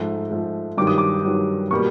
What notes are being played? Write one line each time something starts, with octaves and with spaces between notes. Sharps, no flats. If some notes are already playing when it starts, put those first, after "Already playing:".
Already playing: G#2 F3 A3
G#2 F3 A3
G2 D#3 F#3 D6
D#6
D6
G2 D#3 F#3
B2 G3 A#3 C#6